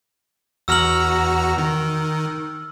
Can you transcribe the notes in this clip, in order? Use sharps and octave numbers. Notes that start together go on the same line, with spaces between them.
E2 F#4 A#5 E6 F6 F#7
D#3